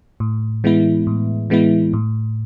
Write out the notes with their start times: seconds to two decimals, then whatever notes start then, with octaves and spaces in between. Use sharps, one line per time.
0.20 A2
0.64 E3 G#3 B3 E4
1.07 A2
1.50 E3 G#3 B3 E4
1.93 A2